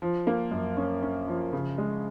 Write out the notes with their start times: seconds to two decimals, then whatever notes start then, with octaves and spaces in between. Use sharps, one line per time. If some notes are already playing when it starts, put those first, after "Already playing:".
0.02 F3
0.27 A#3
0.51 F#2
0.77 C#4
1.02 C#4
1.28 F3
1.53 C#3
1.78 G#3